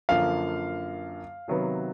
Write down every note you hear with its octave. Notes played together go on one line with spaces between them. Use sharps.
F#2 D3 F3 A#3 F5
C3 D#3 F#3 B3